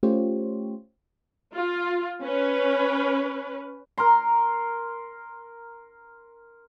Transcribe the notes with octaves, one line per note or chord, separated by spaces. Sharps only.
A3 C#4 F4 G4 C5 C#5
F4
C#4 B4
A#4 A#5 C6